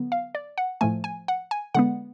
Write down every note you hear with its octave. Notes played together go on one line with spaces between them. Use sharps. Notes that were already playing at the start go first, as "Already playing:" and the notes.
Already playing: D3 F#3 B3
F5
D5
F#5
A2 F3 A3 G#5
G#5
F#5
G#5
D3 G#3 B3 F#5